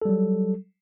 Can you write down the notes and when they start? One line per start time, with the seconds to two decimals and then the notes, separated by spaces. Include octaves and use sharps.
0.02 A4
0.05 G3
0.09 F#3